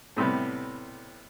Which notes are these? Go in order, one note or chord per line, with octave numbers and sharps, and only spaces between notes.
A2 C3 G3 B3